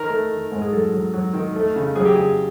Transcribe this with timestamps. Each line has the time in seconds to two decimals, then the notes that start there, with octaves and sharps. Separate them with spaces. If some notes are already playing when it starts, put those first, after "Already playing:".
Already playing: D#3 A#4
0.09 A3
0.31 D#3
0.52 G#2
0.62 G#4
0.72 F#3 A4
0.92 F#3
1.13 F#3
1.33 D#3
1.55 A3
1.76 C#3
1.96 F#3 G#4
2.05 G4
2.16 C#3 G#4